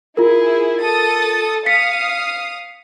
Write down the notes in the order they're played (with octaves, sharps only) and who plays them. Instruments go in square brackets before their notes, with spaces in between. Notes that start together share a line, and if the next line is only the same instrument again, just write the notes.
[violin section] E4 G#4 [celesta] F4 A#4
[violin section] A4 D#6 A6
[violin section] F5 D#6 [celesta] B6 C#7